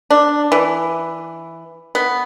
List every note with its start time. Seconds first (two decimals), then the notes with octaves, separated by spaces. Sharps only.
0.10 D4
0.52 E3
1.95 B3